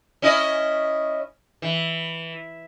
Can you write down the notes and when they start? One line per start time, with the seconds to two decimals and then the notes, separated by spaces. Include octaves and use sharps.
0.22 C#4 E4 D#5
1.62 E3